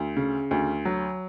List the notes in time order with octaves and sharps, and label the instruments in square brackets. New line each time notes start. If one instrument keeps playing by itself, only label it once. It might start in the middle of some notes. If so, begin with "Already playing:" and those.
Already playing: [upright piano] D2
C#3
D2
F#3